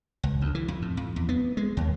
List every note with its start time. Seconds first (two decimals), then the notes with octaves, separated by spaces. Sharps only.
0.23 C#2
0.41 D2
0.55 E3
0.68 F2
0.82 A2
0.97 F2
1.16 E2
1.29 B3
1.57 G#3
1.77 D#2